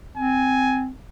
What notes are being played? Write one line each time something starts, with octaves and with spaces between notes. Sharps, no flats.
C4 G#5